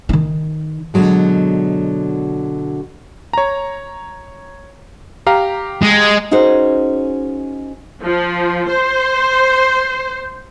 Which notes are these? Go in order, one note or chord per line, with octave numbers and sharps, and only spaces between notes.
D#3 D#4
B2 D3 F#3 G#3
C#5 A#5
G4 F5 A#5
G#3
C#4 D#4 F#4 G#4 C5
F3
C5